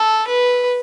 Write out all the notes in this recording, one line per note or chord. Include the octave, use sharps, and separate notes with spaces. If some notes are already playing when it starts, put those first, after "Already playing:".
Already playing: A4
B4